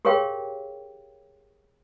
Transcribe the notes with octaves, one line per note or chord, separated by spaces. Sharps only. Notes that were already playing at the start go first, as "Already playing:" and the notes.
G4 G#4 A#4 C#5 F5 G5